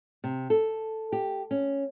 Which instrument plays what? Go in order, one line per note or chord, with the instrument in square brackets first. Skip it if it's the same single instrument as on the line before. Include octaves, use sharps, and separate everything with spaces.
[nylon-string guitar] C3
A4
G4
C#4